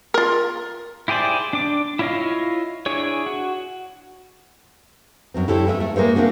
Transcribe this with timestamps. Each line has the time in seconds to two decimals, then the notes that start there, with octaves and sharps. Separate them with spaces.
0.14 F4 A#4
1.08 E4 G4 G#4 C5 D5
1.53 D4 D6
1.99 E4 F4 C#5 D#5 F5
2.86 D4 E4 G#4 C#5
3.26 F#4
5.34 F#2 F#3 C4
5.48 E4 G4 A4 C5 C#5
5.67 G#3 A3 D#5 E5
5.80 A3
5.96 G#3 A#3 G#4 C5 C#5
6.16 A3 A#3 C4 D4 F#4